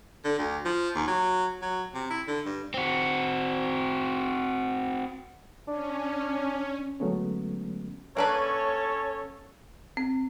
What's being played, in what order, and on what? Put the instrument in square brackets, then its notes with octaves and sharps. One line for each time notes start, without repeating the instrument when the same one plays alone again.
[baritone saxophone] D3
D2
F3
D#2
F#3
F#3
C3
E4
D3
G2
[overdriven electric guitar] C4 F#4
[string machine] C#4 [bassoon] D4
[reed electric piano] D3 F#3 G#3 A3 B3 C#4
[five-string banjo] A#3 D4 B4 [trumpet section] C#4 A4 [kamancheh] C#5
[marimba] C4